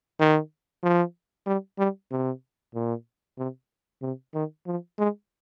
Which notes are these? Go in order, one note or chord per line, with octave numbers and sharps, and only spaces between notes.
D#3
F3
G3
G3
C3
A#2
C3
C3
D#3
F3
G#3